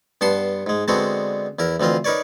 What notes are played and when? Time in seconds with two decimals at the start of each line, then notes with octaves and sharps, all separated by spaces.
0.21 G2 B3 F#5 A5 C6
0.66 G#2 G#3
0.88 D3 G#3 B3 C4 D4 F#4
1.59 E2 E4 A#4
1.80 D2 E3 C4 F4 D#5
2.04 D#4 A#4 B4 C#5 D5